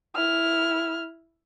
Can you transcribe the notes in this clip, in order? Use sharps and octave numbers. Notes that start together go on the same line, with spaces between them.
E4 F6